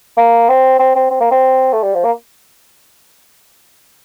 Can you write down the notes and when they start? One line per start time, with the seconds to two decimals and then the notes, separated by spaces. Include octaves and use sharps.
0.17 A#3
0.49 C4
0.79 C4
0.95 C4
1.11 C4
1.21 A#3
1.31 C4
1.73 A3
1.83 G3
1.94 F3
2.04 A#3